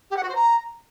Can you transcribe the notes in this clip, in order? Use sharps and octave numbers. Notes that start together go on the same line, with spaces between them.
G4
F#5
F#4
C5
A#5